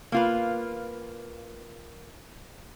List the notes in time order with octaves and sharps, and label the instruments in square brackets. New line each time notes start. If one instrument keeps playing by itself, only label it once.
[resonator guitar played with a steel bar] A#3 F4 B4